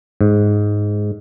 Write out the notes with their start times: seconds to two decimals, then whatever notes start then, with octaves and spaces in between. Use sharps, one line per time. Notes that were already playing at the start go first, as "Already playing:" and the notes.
0.21 G#2